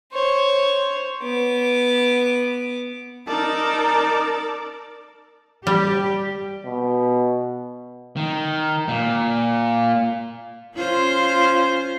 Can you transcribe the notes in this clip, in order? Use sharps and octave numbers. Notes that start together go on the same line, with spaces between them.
C5 C#5
B3 D6
D#4 A#4 D5 A5 D6 E6
G3 G4
B2
D#3
A#2
C#4 F4 C5